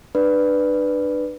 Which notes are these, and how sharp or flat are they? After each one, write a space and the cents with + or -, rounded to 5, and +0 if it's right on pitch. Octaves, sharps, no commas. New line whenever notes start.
D4 +40 B4 +0 D5 +0